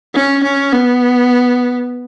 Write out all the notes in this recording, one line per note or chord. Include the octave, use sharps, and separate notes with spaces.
C#4
C#4
B3